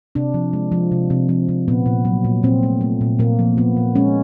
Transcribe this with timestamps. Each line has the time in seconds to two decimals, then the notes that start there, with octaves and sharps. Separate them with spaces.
0.15 C3 D4
0.34 F3
0.53 G#3
0.72 F3
0.92 C3
1.10 C3
1.29 F3
1.49 C3
1.68 A#2 B3
1.86 A#2
2.05 F#3
2.24 A#2
2.43 A#2 C4
2.63 A3
2.81 A3
3.01 A#2
3.19 A#2 A#3
3.39 F3
3.57 A#2 B3
3.77 A#2
3.95 G#3 C#4